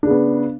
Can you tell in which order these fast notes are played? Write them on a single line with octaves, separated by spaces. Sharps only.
D4 C#3 B3